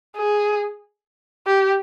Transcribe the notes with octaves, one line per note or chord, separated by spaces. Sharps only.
G#4
G4